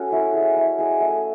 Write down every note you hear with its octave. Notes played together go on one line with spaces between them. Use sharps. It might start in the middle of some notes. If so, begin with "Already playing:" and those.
Already playing: C#4 F#4 A4
E4
G#4 D#5
E4
G#4 D#5
A3